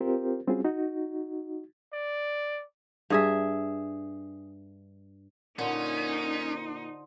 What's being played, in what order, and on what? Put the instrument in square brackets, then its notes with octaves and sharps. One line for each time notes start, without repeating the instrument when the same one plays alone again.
[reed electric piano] C4 F4 G4 A#4 C5
G3 C4 C#4 F4 F#4 G#4
D#4 F#4
[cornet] D5
[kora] G2 G#4 E5
[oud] A#2 [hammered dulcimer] D3 C5 [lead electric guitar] C#4 [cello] D#4